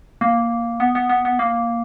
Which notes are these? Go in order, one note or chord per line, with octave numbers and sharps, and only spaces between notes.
A#3
B3
B3
B3
B3
A#3